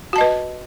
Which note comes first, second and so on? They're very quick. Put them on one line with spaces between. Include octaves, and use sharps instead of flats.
F#4 A5 D#5 B4